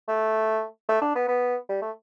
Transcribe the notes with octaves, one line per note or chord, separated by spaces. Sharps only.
A3
A3
D4
B3
B3
G3
A3